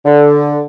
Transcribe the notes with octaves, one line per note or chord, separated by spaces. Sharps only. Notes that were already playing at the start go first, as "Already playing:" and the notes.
D3